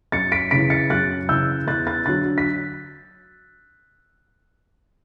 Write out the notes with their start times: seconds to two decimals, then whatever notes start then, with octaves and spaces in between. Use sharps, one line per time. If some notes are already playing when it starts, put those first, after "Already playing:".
0.12 F#2 A6 C#7
0.32 B6 D7
0.51 C#3 E3 B6 D7
0.70 A6 C#7
0.90 F#2 F#6 A6
1.29 C#3 E3 E6 G6
1.67 E2 F#6 A6
1.87 F#6 A6
2.06 D3 F#3 F#6 A6
2.38 B6